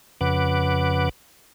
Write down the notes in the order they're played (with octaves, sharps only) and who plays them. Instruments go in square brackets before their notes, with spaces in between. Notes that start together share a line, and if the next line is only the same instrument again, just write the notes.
[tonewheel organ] F2 C#3 B4 F#5 D6